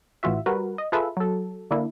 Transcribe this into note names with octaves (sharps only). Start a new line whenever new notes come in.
A1 A2 E3 F4 F#4 E5
G3 F#4 A#4 B4
D#5
F4 G#4 A4 B4 E5
F#3 A4
D3 A#3 D4 E4